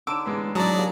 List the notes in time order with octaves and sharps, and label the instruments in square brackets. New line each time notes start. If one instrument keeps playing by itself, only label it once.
[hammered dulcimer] D3 D#4 C#5 [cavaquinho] D6 [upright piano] E6 D7 E7
[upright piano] A1 G#3 B3
[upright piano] A1 C#5 D#6 [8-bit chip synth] F#3 D5 [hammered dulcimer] G#3 [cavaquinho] A5 A#5
[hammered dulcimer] G3 A#3 G4 [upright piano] G#4